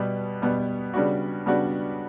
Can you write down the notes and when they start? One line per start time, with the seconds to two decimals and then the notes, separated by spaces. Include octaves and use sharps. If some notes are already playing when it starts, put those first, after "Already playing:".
Already playing: B2 G3 B3
0.42 B2 G3 B3
0.93 C#3 G3 B3 D4 F#4
1.46 C#3 G3 B3 D4 F#4